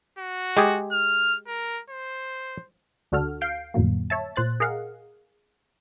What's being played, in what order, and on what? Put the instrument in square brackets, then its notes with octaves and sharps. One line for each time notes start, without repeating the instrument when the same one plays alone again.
[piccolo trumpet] F#4
[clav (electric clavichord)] G#3 G4 G#4
[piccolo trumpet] F6
A#4
C5
[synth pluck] D2 D4 F#4 A4 F6
F5 G6 C7 D7
F2 A2 D3 F#3 A#3
C#5 E5 A5
A#2 C5 F#6 A6
G#4 A#4 D#5 F5 F#5